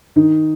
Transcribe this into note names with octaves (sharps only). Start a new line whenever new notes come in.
D#3 D#4